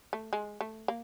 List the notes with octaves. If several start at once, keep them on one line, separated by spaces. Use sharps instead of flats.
A3
G#3
A3
A#3